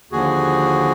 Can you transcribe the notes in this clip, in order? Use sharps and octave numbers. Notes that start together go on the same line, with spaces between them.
D#2 D3 F3 F#4 G#4